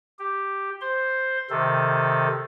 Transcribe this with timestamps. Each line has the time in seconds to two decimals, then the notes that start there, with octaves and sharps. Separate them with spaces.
0.19 G4
0.81 C5 C6
1.50 C3 D#3 A4